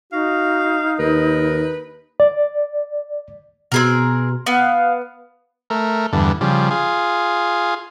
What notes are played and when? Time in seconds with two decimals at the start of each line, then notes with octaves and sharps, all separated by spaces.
0.12 D#4 F#4 F5
0.99 D#2 A#4 B4
2.20 D5
3.72 B2 C4 G#4 A#4
4.46 B3 F5
5.70 A3 A#4
6.13 E2 G2 D3
6.41 C#3 F3 G3
6.71 F4 G#4